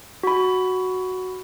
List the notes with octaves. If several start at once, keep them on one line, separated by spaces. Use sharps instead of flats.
F#4 B5